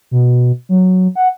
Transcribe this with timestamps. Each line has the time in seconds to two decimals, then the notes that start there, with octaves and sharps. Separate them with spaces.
0.11 B2
0.69 F#3
1.15 F#5